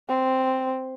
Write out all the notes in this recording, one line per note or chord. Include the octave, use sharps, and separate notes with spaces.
C4